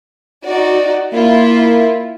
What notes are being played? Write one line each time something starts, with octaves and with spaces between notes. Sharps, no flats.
D#4 F#4 D5
A#3 E4 F4 E5